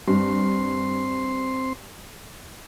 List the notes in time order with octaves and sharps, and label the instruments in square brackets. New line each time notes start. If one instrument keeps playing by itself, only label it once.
[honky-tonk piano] G2 [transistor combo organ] C4 C6